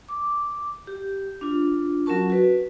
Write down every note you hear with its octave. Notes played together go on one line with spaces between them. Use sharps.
D6
G4
D4 F4
F#3 C#4 F#4 A#4 A5 C#6
F#4 B4